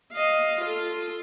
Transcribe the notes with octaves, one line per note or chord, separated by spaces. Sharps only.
D#5 F5
F4 A4